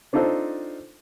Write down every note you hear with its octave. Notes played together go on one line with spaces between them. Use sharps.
C4 D4 D#4 F4 A4 C5